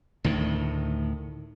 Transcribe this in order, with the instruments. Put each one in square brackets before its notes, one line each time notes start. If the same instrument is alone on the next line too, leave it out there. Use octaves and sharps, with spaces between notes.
[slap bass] D2 A2 D#3